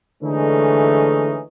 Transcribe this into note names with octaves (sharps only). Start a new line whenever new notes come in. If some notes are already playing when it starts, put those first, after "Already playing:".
D3 E3 G#3 A3 C#4 D#4